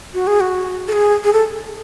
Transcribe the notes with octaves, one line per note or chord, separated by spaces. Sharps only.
F#4
G#4
F#4
A4
G#4
G#4
A4